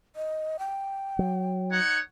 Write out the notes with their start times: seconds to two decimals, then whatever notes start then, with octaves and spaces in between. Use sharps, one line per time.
0.16 D#5
0.59 G5
1.19 F#3
1.70 D#4 C#5 F#5